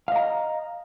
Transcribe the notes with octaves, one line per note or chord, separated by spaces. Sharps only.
D#5 F5 A#5